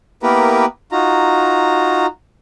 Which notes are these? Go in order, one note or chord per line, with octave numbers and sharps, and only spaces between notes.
A#3 B3 E4 G4 A#4 B4
D#4 F4 F#4 A#5